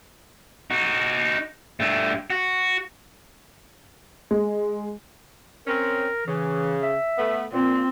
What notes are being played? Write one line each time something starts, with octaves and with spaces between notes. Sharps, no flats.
D#4 F#4
G2 A3
F#4
G#3
C4 C#4 A#4
C#3 E3
E5
A3 B3
A#2 C4 F4